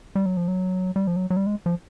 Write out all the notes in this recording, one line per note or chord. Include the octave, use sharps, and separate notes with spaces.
G3
F#3
F3
F#3
G3
F3
F#3
F#3
G3
G#3
F3